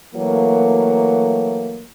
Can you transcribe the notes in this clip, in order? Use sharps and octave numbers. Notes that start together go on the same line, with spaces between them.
E3 F#3 A3 A#3